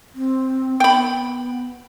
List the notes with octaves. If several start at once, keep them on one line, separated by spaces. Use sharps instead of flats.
C4
B3 G5 B5